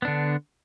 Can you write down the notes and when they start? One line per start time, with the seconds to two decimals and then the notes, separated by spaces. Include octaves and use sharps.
0.02 B3
0.05 D4
0.07 D3